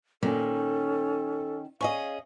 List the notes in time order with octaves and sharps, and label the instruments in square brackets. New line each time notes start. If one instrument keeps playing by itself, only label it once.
[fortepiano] A#2 [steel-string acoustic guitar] D#3 [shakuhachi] C#4 [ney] A4
[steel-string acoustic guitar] C#4 G#4 D#5 [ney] F5 [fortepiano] C#6